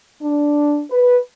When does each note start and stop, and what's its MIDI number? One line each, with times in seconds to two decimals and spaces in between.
0.22 0.83 62
0.91 1.18 71